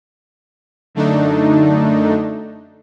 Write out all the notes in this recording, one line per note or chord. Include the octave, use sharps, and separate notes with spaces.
F#2 D3 A3 D4 D#4